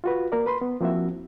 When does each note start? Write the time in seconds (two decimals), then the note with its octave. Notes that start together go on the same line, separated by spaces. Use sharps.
0.04 F4 F#4 B4
0.32 A#3 A#4 D5
0.46 B4 B5 C6
0.61 B3
0.81 F3 A#3 C4 E4 F#4 E5